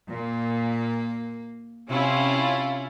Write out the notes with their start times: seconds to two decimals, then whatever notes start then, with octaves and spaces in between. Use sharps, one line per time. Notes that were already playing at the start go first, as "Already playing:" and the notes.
0.10 A#2 A#3
1.89 C3 C#4 E4 F4